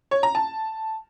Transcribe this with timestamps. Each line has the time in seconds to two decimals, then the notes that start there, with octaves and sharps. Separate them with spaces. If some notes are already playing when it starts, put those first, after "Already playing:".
0.11 C#5
0.23 A#5
0.35 A5